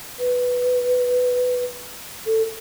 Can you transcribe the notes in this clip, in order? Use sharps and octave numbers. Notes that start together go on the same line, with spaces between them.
B4
A4